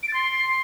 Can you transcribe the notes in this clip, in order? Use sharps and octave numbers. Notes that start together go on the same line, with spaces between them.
D7
A6
C6